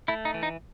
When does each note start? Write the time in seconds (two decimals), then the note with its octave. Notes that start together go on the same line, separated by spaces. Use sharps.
0.08 A3 E4
0.25 D#4
0.34 E3
0.43 D#4